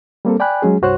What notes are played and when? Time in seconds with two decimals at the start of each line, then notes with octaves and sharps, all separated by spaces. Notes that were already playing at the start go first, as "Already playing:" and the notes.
0.25 G3 A#3 C4 A4
0.40 D5 G5 G#5 B5 F#6
0.62 F#3 G#3 C#4 G#4
0.82 C2 G2 F#4 C5 C#5 F#6